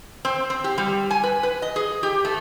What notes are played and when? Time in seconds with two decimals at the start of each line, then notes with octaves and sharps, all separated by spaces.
0.25 C4
0.50 C4
0.64 G4
0.78 G3
1.11 G#5
1.23 B4
1.43 B4
1.62 D#5
1.76 G#4
2.03 G4
2.25 A3